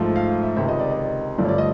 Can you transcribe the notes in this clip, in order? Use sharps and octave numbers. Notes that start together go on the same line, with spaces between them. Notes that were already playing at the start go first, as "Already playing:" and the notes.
Already playing: G#2 F3 A3
F5
E5
C#2 C3 D#3 E5
D#5
D5
D#5
G2 D3 F3 A3 D5
C#5
D5
D#5